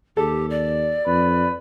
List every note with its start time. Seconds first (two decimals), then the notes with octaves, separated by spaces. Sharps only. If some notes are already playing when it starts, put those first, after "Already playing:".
0.17 D#2 G4 A4
0.50 D5
1.06 F2 B4